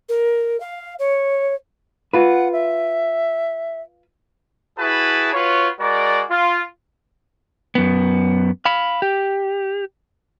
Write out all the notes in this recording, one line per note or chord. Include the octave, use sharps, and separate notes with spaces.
A#4
F5
C#5
F4 B4 F#5
E5
E4 F#4 G#4 B4 A5
F4 F#4 B4 C#5
G#3 F#4 A#4 D5
F4
F#2 B3
F5 B5
G4